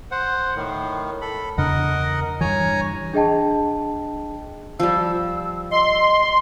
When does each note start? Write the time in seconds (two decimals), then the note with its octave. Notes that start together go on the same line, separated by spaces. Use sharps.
0.11 C5 F#5
0.56 A2 D#3
1.21 A4 B5
1.58 E2 C#3 D4 A#4 D#5 F#5
2.41 G2 E3 C#5 G#5 A#5
3.13 D4 G#4 D#5 G5 A5
4.80 F3 G3 E6
5.71 D#5 C6